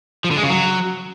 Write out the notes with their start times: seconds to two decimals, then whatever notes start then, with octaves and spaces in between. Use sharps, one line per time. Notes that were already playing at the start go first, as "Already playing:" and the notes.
0.24 F3
0.31 D3
0.37 G#3
0.43 C#3
0.50 F#3